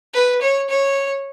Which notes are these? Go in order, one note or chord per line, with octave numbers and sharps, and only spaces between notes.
B4
C#5
C#5